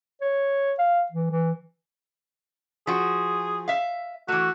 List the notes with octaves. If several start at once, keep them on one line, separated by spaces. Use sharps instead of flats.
C#5
F5
E3
E3
F3 F#4 G#4
E5 F5
E3 A3 F#4